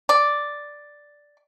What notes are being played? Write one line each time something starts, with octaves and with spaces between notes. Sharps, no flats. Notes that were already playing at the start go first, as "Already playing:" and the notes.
D5